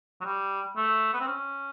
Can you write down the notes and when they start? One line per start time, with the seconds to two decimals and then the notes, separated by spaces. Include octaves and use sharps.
0.21 F#3
0.25 G3
0.76 A3
1.13 B3
1.20 C4
1.27 C#4